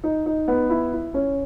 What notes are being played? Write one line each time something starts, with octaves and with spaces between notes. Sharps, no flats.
D#4
D#4
B3
E4
E4
C#4